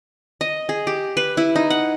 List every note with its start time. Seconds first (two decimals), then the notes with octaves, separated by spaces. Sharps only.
0.41 D#5
0.69 G#4
0.87 G4
1.17 B4
1.37 E4
1.56 D#4
1.70 F#5